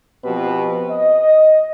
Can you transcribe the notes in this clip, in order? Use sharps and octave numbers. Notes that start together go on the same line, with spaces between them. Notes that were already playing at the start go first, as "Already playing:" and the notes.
B2 F3 C4 G4 B4
D#5